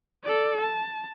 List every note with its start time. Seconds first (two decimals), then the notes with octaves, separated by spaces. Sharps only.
0.24 A4 D5
0.61 A5